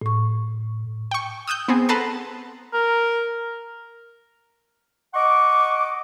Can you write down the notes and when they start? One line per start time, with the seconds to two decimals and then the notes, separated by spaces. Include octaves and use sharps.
0.02 A2 C#6
1.11 G5 C#6
1.47 D#6 E6 F#6 G6
1.68 B3 C4 G#4
1.89 A4 B4 F#5 A5 A#5 C6
2.73 A#4
5.14 D#5 F#5 C#6 D6